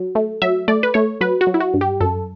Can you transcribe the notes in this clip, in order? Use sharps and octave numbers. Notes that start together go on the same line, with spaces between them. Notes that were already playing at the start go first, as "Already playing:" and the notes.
Already playing: F#3
A3
F#3 E5
A3 D5
B4
A3 C#5
F#3 B4
F#4
F#3
E4
F#4
G2
G4
F#2 A4